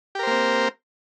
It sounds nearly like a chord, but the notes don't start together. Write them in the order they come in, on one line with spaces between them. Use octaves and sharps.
G4 A#4 C5 A#3 C4